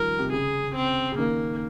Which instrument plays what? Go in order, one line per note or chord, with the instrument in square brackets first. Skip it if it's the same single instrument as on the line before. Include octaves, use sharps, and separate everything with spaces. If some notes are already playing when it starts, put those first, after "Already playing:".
Already playing: [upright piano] D#3 F3 G3 [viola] A#4
[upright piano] C3
[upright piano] C#3 [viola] G#4
[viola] C4
[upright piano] C#3
[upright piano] D#3 [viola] A#3